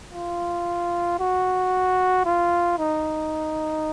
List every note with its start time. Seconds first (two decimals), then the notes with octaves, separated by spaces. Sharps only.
0.12 F4
1.19 F#4
2.25 F4
2.79 D#4